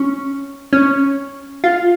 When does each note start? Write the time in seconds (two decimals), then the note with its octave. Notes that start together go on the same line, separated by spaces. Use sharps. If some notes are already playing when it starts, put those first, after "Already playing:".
Already playing: C#4
0.73 C#4
1.64 F4